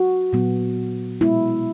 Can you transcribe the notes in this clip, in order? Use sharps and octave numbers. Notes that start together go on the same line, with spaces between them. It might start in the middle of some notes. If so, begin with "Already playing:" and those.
Already playing: F#4
A#2 F#3 B3
B2 G#3 B3 E4